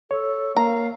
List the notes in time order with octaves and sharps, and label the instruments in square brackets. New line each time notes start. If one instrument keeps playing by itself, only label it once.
[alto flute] A4 [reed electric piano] C#5
[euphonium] A#3 [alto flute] F5 [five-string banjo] A#5